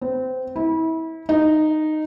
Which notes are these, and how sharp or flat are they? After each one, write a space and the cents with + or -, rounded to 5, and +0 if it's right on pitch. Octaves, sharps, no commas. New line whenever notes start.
C4 -25
E4 -30
D#4 -10